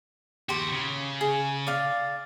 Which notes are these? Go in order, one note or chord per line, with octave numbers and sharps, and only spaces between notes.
D#2 F#4 G4 C6
C#3
G#4
D5 F5